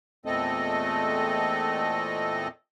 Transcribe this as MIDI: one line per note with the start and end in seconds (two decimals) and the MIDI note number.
0.26 2.48 40
0.26 2.48 46
0.26 2.48 57
0.26 2.48 60
0.26 2.48 69
0.26 2.48 75